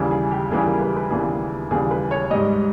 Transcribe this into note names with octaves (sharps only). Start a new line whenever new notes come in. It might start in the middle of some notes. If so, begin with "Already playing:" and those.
Already playing: D#2 C#3 E3 G3
G#4
G4
D#2 C#3 E3 G3 G#4
A#4
B4
B4
D#2 C#3 E3 G3 G#4
D#2 C#3 E3 G3 G#4
B4
C#5
G#2 G3 D#5